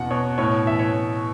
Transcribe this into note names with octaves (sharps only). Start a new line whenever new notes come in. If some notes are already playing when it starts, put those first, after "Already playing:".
Already playing: E2 B2 F#5
B2 C#5
A2 C#5
E3 E5
C#5
A2